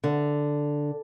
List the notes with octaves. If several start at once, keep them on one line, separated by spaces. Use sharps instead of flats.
D3